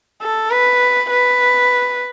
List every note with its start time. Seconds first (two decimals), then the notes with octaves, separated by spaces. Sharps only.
0.22 A4
0.51 B4
1.10 B4